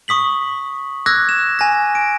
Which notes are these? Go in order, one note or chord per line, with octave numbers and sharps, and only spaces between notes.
C#6 D#6 B6 F#7
D6 E6 F#6 G#6 A#6
E7
G#5 A#6
D7